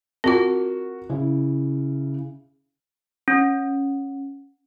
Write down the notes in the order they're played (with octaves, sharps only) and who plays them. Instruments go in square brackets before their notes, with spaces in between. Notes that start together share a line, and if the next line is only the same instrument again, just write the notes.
[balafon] C4 F4 [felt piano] F#4 A#4
[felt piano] C#3 E4
[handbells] C#4